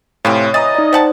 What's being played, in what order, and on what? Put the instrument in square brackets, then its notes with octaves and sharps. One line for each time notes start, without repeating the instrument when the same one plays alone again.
[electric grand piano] A2 C3 [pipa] E3 C4 F4 [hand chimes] C#5
[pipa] E3 [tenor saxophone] D#5 [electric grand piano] A#5 D#6 A6
[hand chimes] D#4 D5
[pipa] G3 F#5 A5 [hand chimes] C5